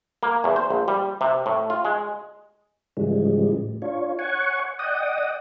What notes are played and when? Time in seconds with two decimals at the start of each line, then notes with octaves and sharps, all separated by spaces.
0.23 A#3
0.44 E2
0.56 C5
0.70 A#1
0.88 G3
1.21 C3
1.46 A2
1.70 F4
1.85 G#3
2.97 G#2 C#3 E3 F3 G3 G#3
3.52 A2
3.82 D4 F4 C#5
4.19 C#5 F#5 G#5 C#6
4.79 D5 D#5 F#5 G5 D#6